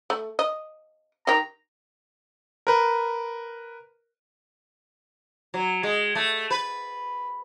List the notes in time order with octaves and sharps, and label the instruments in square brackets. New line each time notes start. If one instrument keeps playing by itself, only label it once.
[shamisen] A3
D#5
[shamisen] D#3 G4 [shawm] A#5
[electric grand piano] A#4 B4
[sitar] F#3
G#3
A3
B4